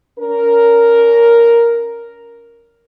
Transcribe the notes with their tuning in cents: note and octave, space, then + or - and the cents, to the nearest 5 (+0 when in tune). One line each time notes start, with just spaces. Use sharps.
C#4 +35 A#4 +0